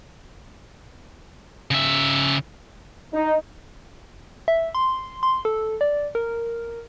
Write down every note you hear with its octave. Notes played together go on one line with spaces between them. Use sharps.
C#3 E5
D#4
E5
C6
C6
A4
D5
A#4